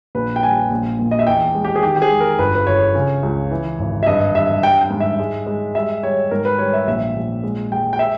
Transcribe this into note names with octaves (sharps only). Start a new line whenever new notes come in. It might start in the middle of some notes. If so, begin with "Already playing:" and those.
A#1 B4
G5
G3 G#5
A#1
A#2
D#5
E5
E2 G5
G#3
G4
G#4
D#3 G4
G4
G#4
G#3
A#4
G1 B4
B4
G1 C#5
C#3
C#2
E3
G#1
E5
G2 D#5
G2 E5
G3 G5
G5
G#2
E5
G#3
G#3
G3 E5
G3 C#5
G#2 A#4
B4
G3 C#5
E5
A#1 E5
A#1
G#3
G#3 G5
G5
E5